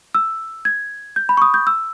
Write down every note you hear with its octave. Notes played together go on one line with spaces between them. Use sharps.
E6
G#6
G6
B5
C#6
D#6
G6
E6